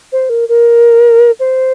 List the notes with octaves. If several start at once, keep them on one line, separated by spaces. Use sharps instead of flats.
C5
A#4
A#4
C5